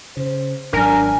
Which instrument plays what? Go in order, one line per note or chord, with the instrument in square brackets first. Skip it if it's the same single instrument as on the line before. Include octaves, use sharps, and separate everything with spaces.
[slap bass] C#3 [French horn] C5
[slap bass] G#1 F#3 [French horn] D4 [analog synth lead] A#4 [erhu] G#5